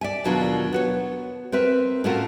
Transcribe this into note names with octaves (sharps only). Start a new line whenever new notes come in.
D5 E5 G#5
D#2 B2 F#3 D4 F4 A#4
B3 F#4 C#5
C4 A#4 B4 E5
A2 A3 C#4 F4 F#4 A#4